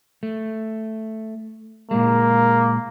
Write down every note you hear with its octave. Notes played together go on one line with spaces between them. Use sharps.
A3
A#2 G#3 A#3